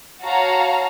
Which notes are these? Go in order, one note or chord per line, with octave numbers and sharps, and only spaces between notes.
F#4 C#5 F5 A5 A#5